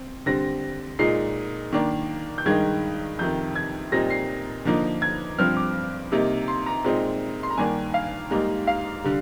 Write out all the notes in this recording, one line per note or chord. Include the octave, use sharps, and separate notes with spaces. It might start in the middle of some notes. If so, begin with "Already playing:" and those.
Already playing: C4
D3 G3 C4 A#6
A#2 G#3 D#4 C7
D#3 A#3 D4
G6
G2 D#3 G#3 D#4 G#6
F2 C3 D#3 G6
G#6
A#2 G3 C4 D#4 A#6
C7
D3 F3 A#3 D#4
G#6
G2 F3 C4 F6
D6
C3 G3 A#3 D#4
C6
A#5
A#2 G#3 C4 D#4
C6
A#5
G2 D#3 A#3 D4 G#5
F5
G#2 G3 A#3 D#4
F5
D3 G3